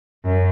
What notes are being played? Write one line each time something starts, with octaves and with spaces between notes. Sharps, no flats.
F#2